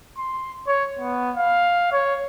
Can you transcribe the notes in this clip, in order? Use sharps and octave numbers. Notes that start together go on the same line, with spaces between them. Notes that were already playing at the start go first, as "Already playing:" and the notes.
C6
C#5
B3
F5
C#5